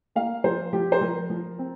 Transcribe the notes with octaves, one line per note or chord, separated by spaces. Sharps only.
A#3 F5
F3 C5
F3 G4
C5
F3 A#4
F3
C4